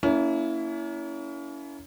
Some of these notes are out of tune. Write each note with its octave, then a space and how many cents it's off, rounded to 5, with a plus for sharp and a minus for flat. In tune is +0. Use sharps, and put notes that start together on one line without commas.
A#3 +0 C#4 +35 E4 +0